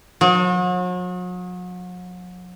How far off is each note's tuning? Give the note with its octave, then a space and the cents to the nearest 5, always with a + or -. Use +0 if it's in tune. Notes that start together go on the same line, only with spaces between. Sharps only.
F#3 -40